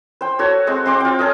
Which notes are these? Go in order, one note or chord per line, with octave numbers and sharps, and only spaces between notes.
C5 G5
F#4 A4 C#5
G#3 C4
C4 C6 D6
F4 G5
C#4 A4 D#5